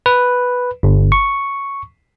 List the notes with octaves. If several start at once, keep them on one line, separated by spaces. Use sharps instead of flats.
B4
G1
C#6